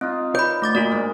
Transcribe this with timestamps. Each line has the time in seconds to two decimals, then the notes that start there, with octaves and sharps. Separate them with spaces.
0.01 C4 D#4 F4
0.35 B4 C#5 D5 B5 G6
0.62 D3 A3 D6 A6
0.75 A#2 A#3 D#4 F4 F#4 D5
0.92 G#2 A#4